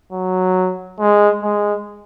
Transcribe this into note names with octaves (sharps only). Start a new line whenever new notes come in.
F#3
G#3
G#3